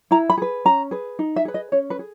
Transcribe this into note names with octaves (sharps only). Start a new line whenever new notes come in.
E4 A#5
B5
G#4 B4
C#4 A#5
G#4 B4
D#4
E5
G#4 B4
D#5
C#4 C#5
B4
G#4